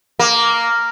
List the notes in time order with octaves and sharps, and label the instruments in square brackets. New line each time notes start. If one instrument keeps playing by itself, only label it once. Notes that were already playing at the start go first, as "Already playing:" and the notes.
[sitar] A#3